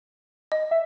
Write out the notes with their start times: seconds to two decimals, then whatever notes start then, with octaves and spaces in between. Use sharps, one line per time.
0.52 D#5
0.71 E5